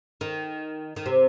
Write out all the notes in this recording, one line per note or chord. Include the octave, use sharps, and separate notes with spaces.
D#3
D#3
C3